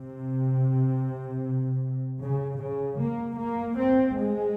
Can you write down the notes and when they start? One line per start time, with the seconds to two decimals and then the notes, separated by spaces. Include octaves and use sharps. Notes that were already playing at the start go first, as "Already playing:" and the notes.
Already playing: C3
2.22 C#3
2.61 C#3
2.99 A#3
3.38 A#3
3.78 C4
4.16 G#3